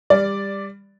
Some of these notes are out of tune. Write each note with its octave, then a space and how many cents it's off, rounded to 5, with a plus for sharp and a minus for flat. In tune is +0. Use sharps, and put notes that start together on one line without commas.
G3 +25 D5 +0